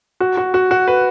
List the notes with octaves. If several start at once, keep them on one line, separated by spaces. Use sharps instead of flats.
F#4
F#4
F#4
F#4
B4